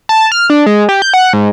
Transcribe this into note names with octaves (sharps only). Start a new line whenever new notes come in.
A5
F6
D4
G#3
G4
G6
F#5
G#2